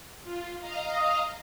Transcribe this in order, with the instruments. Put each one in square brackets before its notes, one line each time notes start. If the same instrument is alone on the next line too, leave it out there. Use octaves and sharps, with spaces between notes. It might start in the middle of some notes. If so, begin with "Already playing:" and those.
[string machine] F4
D#5 F5 A#5
[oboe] D#6